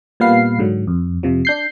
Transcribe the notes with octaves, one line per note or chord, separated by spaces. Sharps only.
A#2 G3 B3 B4 F5 C7
G#2 D3 F#3
F2
F2 C3 F3
D4 G6 C7